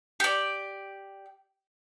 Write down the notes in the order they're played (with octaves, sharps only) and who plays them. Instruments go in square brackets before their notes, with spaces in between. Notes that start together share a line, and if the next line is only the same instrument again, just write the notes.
[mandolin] G4 D5